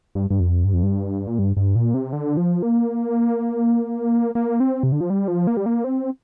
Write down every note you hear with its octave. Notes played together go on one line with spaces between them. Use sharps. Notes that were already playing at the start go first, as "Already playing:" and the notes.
G2
G2
F2
G2
F2
G2
A#2
G2
G2
A#2
C3
D3
F3
A#3
A#3
C4
C3
D3
F3
G3
F3
A#3
G3
A#3
C4